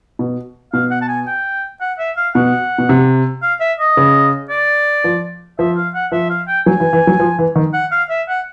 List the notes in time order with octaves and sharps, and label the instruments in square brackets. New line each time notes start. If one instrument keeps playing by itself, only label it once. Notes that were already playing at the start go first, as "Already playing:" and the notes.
[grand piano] B2
[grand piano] B2 [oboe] F5
[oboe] F#5
A5
G#5
G5
F#5
E5
F5
[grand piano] B2 [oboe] F#5
[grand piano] B2
C3
[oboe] F5
E5
D#5
[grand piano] C#3
[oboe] D5
[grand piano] F3
[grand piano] F3 [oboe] E5
[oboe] F5
F#5
[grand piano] F3 [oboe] E5
[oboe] F5
G5
[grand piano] F#3 [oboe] G#5
[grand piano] E3
E3
F#3
F3
E3
D#3
[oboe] F#5
F5
E5
F#5